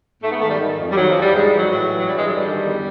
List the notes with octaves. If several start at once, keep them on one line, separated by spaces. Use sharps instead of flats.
G#2 A3
B3
D#3 A3
G3
D#3
F2
G3
D#3 F#3
F3
E2
G3
G#2 G#3
G3
E3
F#3
A2 F#3
E3
F#3
G2 G3
G#3
D3 F#3
G3
D#3
E2